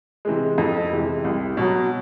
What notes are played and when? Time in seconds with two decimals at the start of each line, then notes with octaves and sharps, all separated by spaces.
0.25 C3 E3 G#3
0.58 F2
0.91 C3 E3 G#3
1.25 C2
1.57 B2 F#3